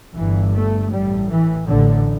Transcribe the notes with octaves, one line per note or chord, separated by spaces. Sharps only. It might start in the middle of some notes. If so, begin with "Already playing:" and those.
G1 G2 E3
A3
A1 A2 G3
E3
A1 A2 D3